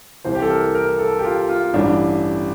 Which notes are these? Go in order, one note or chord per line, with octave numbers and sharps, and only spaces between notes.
C2 C3 E3 C5
G4
A4
A#4
A#4
A4
G4
F4
F4
A1 G2 E3 D4